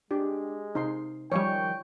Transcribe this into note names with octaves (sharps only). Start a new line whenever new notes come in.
G#3 D4 G4
C3 D#4 C6
D#3 F3 G3 C#5 G5 C#6